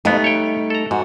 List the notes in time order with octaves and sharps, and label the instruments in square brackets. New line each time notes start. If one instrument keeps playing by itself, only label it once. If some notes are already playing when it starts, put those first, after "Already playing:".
[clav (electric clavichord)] F2 B3 [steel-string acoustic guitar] G3 A3 D#4
[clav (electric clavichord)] C#5 G5
A4 A#5
[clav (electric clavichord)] G#2 [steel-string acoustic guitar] F#4